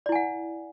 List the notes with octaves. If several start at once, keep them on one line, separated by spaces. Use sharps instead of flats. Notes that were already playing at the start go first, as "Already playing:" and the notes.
E4 D5 F#5 G#5